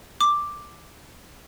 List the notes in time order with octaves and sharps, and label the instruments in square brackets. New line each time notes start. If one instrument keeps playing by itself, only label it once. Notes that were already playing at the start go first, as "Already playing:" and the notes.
[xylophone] D6